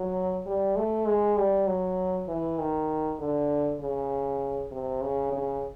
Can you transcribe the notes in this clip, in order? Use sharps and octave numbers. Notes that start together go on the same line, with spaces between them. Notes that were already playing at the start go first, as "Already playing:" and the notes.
Already playing: F#3
G3
A3
G#3
G3
F#3
E3
D#3
D3
C#3
C3
C#3
C#3